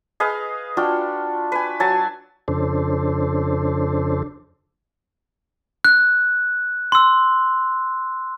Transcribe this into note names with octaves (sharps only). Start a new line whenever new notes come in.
G#4 B4 D#5 F5
D4 F4 F#4 G5
B4 G#5
F#3 G#5 A5
F2 C#3 D4 A4 C5
F#6
C6 E6